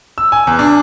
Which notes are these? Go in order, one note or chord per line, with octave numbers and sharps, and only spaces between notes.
E6
G#5
E2
D4